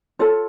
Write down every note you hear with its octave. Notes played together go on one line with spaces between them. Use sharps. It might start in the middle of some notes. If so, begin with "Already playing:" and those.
F4 A4 C#5